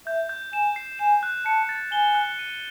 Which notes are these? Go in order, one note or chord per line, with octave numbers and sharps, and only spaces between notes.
E5 G6
G6
G#5 E7
C7
G#5 E7
F#6
A5 C#7
A6
G#5 G7
F#6
D#7